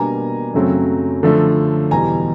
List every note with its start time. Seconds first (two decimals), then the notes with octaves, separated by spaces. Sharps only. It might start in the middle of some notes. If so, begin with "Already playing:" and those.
Already playing: B2 G3 A#3 D4 G#5 A#5
0.54 F#2 C#3 F#3 A3 C4
1.23 D3 F3 A3
1.91 E2 B2 G3 G#5 A#5